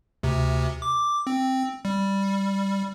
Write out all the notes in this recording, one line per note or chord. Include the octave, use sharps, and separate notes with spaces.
D2 C3
D6
C4
G3